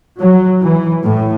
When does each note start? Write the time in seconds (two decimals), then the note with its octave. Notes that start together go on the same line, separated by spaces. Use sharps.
0.19 F#3
0.61 E3
1.04 A2